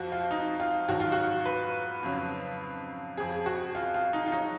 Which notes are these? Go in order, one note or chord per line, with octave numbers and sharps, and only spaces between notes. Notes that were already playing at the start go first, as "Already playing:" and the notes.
Already playing: F2 F3 F#4
F4
D#4
F4
G#2 D#3 F#3 F#4
F4
F#4
B4
F2 C#3 F#3
F2 F3 G#4
F#4
F4
F4
D#4
F4
F#3 D#4